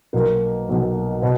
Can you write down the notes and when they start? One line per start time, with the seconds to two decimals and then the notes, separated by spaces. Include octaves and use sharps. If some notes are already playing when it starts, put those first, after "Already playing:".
0.13 B1 B2 F#3 A#3
0.69 B1 B2 F#3
1.22 B2